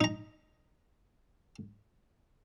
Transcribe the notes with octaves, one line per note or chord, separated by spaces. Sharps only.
D#4 A#5